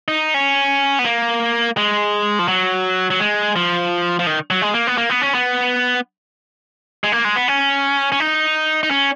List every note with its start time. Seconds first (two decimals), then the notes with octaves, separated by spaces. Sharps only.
0.08 D#4
0.34 C#4
0.99 B3
1.05 A#3
1.77 G#3
2.39 F3
2.48 F#3
3.10 F#3
3.20 G#3
3.56 F3
4.19 F3
4.27 D#3
4.50 F#3
4.62 G#3
4.74 A#3
4.87 B3
4.98 A#3
5.10 B3
5.21 C#4
5.34 B3
7.04 G#3
7.12 A#3
7.25 G#3
7.36 B3
7.48 C#4
8.12 C#4
8.20 D#4
8.83 D#4
8.91 C#4